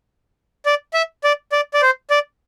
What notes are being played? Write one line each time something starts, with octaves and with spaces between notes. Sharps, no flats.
D5
E5
D5
D5
D5
C5
D5